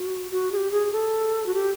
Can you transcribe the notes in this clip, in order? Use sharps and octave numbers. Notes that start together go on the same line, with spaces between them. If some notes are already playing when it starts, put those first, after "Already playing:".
Already playing: F#4
F#4
G#4
G4
G#4
A4
F#4
G4